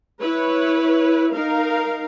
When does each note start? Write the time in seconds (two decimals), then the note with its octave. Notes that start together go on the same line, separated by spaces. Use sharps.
0.20 E4 B4 C#5
1.33 D#4 A#4 F5